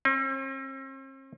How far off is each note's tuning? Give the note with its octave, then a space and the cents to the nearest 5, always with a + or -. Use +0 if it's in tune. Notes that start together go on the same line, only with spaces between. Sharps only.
C4 +45